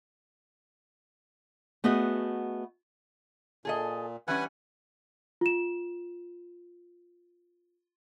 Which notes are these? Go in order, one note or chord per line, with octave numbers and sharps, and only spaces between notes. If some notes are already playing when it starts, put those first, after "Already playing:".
A3 B3 F#4 G#4 D#5
A#2 G#4 A4 D#5
E3 G3 C#4 B4 F#5 G#5
F4 E7